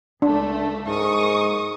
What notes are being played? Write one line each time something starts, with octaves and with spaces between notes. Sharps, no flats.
C#2 A3 D4
G#2 A#4 C#6 D#6